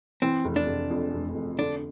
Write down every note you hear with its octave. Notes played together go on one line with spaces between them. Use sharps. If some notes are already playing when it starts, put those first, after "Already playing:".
E3 C4
F1
D4
F1
F2
F1
F1
D3 D4